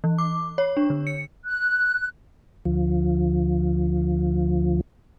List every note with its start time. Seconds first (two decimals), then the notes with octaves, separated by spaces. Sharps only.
0.04 E3
0.18 D6
0.58 C#5
0.77 D4
0.90 D3
1.07 C#7
1.45 F#6
2.65 D2 F3